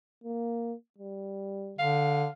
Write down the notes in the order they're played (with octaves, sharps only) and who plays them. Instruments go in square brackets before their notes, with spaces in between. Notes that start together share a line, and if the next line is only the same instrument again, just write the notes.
[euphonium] A#3
G3
[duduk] D3 [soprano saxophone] F5